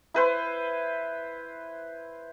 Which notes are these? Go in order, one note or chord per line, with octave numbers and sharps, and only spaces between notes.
E4 B4 C5